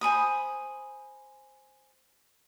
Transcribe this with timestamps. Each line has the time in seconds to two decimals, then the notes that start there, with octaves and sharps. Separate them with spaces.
0.01 C5 G#5 B5 D#6